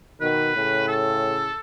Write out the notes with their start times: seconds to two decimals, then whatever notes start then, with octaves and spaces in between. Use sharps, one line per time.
0.20 B2 D#3 B4
0.55 A2 C#3
0.88 A4